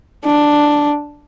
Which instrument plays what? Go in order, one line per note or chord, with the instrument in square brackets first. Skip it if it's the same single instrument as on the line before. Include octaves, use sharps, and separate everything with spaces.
[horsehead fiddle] D4